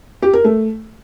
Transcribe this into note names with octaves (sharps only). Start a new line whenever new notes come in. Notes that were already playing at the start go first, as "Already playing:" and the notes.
G4
A#4
A3